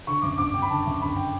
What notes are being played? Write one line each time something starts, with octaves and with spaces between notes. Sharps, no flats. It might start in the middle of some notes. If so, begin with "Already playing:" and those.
D3 C#6
F#2 D6
G1 D6
G1 G5
B5
D3 A5
F#2
G1 B5
G5